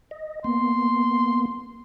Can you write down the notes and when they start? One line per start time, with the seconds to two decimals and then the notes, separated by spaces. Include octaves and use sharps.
0.11 D#5
0.44 A#3 B3 C6